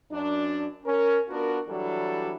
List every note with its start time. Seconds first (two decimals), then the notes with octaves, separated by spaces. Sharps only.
0.12 F#2 D4
0.86 C#4 A#4
1.29 B3 D4 F4 F#4 A#4
1.69 E3 F#3 G3 D4 F#4 A4